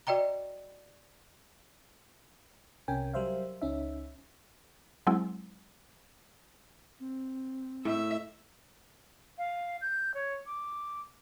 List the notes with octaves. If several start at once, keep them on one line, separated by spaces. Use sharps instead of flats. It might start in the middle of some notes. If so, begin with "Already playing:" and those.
F#4 D5 D#5 G5 A#5
C2 C3 C#4 A#4 G5 G#5
F#3 G3 A#4 C5 E5 F5
C#2 C#4 D#4 E5
F#3 G#3 C4 E4
C4
A2 E5
F5
G6
C#5
D6